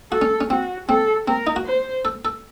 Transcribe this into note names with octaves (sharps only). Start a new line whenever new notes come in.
F#4 A4
C#4
C#4
C4 F#4
C4 A4
C4 A#4
D#4
F#4
C5
A4
A4